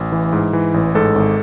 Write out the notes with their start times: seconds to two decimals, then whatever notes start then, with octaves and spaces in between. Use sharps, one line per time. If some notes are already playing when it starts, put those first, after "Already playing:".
Already playing: A1
0.12 E3
0.33 G#2
0.53 E3
0.74 A1
0.95 G#2 A4
1.16 G#1